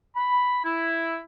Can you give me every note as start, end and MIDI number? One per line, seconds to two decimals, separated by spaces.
0.16 0.61 83
0.64 1.19 64